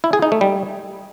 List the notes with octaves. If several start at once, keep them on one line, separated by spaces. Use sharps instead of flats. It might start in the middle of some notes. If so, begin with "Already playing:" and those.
E4
G#4
D#4
A3
G3